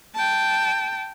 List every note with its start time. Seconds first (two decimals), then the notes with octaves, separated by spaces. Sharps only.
0.15 G5 A5